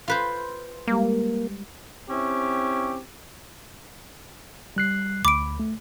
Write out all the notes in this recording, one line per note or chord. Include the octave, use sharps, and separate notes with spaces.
F4 B4 C5
G3 G#3 A#3 G4
C4 C#4 E4 G4
G3 F#6 C7
D2 B5 D6 D7
A3